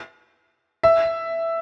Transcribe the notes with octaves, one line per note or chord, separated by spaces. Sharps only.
E5